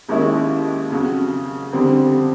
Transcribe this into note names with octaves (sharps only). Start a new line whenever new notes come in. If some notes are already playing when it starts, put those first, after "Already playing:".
D#2 D#3 G#3 C#4 E4
F2 C#3 F#3
F2 D3 G3 C4